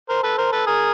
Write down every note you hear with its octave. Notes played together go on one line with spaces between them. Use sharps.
A#4 C5
A4 B4
A#4 C5
A4 B4
G#4 A#4